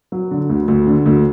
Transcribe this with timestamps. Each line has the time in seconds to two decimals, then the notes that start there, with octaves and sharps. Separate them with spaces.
0.12 F#3
0.31 D3
0.49 D2
0.68 D2
0.87 D3
1.06 D2